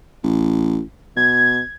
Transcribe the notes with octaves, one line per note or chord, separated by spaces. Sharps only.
A1
B2 G#6